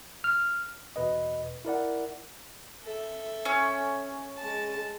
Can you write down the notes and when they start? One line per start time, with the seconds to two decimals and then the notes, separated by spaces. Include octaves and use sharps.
0.24 F6
0.96 E2 B2 B4 D#5
1.65 E4 A#4 D5 F#5
2.84 A4 E5
3.45 C#4
4.38 G#3 A5